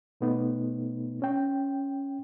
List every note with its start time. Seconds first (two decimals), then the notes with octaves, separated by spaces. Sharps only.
0.21 B2 A3 B3 D#4
1.22 C#4 G5